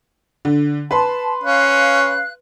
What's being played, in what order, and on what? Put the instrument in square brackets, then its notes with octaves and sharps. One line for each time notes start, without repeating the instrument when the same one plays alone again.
[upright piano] D3
[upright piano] B4 C6 [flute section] A5
[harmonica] C#4 [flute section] F5 F#6